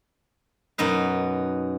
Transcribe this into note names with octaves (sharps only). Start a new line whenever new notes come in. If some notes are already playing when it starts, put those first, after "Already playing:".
F#2 B2 D#4 B4